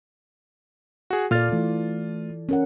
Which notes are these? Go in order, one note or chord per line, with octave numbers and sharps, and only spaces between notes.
F#4 G#4
A#2 F4 A4 D5 F6 A6
E3 A3
C#4 A#4 F#5